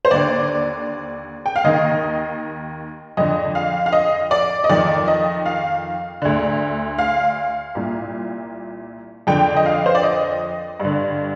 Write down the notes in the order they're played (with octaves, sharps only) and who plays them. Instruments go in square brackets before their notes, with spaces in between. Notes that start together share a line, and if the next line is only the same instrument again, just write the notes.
[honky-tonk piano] C5
D#2 D3 D5
G5
F5
D#2 D#3 D#5
F2 D3 D#5
F5
F5
D#5
D5
D#5
F2 D#3 D5
D#5
F5
D2 D3
F5
C2 A#2
F2 D3 G5
D#5
F5
C5
D5
D#5
G2
D3